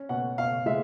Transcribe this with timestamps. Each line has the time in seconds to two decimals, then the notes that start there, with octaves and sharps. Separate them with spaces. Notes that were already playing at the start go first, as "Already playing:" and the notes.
Already playing: C#4
0.09 B2 F#5
0.38 B2 F5
0.66 G#3 E5